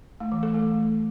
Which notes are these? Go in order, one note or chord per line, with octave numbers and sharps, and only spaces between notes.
A3
E3
A4
A3